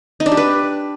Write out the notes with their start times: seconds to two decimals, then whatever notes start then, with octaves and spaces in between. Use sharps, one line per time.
0.20 D#4
0.26 D4
0.32 G4
0.37 B4